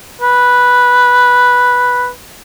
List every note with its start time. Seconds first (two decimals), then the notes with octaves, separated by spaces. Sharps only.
0.22 B4